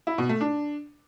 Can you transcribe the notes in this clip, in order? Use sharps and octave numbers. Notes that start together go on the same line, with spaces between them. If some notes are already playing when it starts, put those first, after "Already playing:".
E4
B2
A3
D4